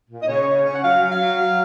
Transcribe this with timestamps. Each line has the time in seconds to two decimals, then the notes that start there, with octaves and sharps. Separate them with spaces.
0.09 A#2
0.21 D#5
0.27 C#3 C#5
0.47 C#3
0.65 C#4
0.73 F#5
0.84 F#3 F5
1.02 F#3
1.12 F5
1.21 F#3
1.40 F#3